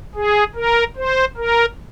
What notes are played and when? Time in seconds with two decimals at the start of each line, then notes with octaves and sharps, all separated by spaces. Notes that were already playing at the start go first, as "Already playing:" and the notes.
0.15 G#4
0.55 A#4
0.97 C5
1.37 A#4